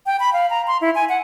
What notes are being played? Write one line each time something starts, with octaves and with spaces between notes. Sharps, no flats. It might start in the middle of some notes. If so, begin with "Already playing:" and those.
G5
B5
F5
A#5
C6
E4
G#5
F#5